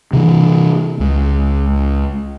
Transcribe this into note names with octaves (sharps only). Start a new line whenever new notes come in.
C3 E3
C#2